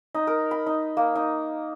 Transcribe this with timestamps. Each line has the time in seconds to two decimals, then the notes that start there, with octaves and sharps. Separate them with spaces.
0.15 D#4
0.27 A#4
0.51 B5
0.66 D#4
0.97 A#3
1.15 D#4